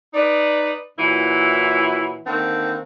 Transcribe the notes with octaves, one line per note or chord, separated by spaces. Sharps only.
D#4 B4 D5
A#2 E3 F#3 E4
D3 D#3 A#3 C4